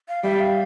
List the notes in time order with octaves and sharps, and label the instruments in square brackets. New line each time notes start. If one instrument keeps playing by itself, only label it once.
[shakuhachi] F5
[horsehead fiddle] G3 [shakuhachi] E5
[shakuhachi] F5